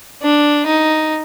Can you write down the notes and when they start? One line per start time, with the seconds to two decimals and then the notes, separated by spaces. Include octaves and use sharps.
0.23 D4
0.66 D#4